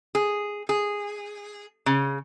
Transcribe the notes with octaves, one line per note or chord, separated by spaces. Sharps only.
G#4
G#4
C#3